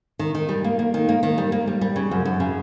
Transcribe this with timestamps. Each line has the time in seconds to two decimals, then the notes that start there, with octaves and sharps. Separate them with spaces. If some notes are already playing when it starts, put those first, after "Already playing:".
0.19 D#3
0.35 D#3
0.49 G3
0.64 A#3
0.79 A#3
0.94 D#3
1.09 A#3
1.23 D#3
1.38 G3
1.52 A#3
1.67 G3
1.81 G3
1.96 C#3
2.11 F#2
2.25 F#2
2.40 C#3